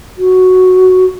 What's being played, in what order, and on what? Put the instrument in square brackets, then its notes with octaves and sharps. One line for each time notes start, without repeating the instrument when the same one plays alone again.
[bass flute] F#4